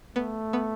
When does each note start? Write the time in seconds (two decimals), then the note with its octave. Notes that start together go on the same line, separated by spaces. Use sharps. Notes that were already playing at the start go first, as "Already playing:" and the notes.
0.16 A3 B3
0.53 B3